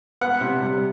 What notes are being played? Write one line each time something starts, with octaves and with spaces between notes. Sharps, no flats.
B3 F#5
C3
G3